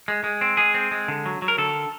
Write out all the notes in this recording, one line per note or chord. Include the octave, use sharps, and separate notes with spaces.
G#3
G#3
C4
G#3 G#4
C4
G#3
D3
F#3
F#3
A#4
D3 A4